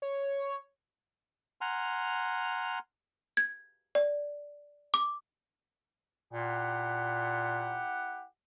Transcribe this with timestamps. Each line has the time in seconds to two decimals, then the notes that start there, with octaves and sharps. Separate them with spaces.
0.02 C#5
1.61 F#5 G#5 A#5 C6 F6
3.37 G#6
3.95 D5
4.94 D6
6.33 A#2 E4 G4 F#5